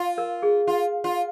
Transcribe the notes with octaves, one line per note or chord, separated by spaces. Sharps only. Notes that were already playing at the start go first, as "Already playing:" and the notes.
Already playing: F4
A#4
G#4
F4
F4